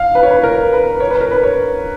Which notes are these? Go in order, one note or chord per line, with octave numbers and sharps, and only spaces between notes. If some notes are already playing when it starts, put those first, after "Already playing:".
Already playing: F5
B4
C#5
B4
A#4
B4
C#5
B4
A#4
B4
C#5